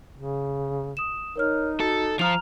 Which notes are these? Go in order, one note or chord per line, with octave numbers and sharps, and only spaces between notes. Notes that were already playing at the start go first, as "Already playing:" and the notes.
C#3
D#6 E7
D#4 A#4 C#5 F6
F#4 A4
F3 F4 A#5 F6 F7